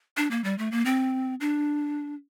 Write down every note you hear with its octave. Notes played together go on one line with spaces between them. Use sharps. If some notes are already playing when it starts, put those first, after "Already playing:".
D4
A#3
G3
A3
A#3
C4
D4